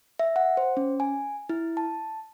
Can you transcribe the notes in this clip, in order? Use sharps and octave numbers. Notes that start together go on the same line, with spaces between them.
E5
F#5
C5
C#4
G#5
E4
A5